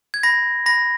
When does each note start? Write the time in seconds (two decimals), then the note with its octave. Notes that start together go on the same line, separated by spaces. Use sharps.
0.14 G#6
0.23 B5 A#6
0.66 B5 A#6